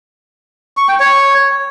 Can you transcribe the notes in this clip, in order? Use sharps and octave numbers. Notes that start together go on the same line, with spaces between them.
C#6
G5
C#5